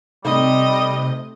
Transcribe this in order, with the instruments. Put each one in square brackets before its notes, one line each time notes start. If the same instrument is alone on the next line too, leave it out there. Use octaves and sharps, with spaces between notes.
[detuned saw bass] C3 [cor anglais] G3 [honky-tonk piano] A3 C4 D#4 [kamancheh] D#5